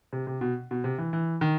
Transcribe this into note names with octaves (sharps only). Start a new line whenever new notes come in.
C3
C3
B2
B2
C3
E3
E3
D#3